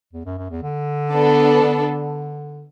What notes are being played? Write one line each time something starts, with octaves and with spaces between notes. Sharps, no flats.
E2
F#2
F#2
E2
D3
B3 D4 A4
D3